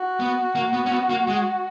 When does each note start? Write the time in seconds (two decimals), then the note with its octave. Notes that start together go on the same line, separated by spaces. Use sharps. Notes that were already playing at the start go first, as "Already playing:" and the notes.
Already playing: F#4
0.20 B3
0.55 A#3
0.73 B3
0.86 C#4
0.91 B3
1.10 A#3
1.28 G#3